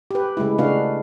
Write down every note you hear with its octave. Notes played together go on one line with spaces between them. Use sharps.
G4 B4
C#3 G#3 A3 E4
C#3 A3 D4 F#4 B4 F5